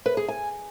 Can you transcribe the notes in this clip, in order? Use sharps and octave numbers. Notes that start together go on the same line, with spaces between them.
B4
G#4
G#5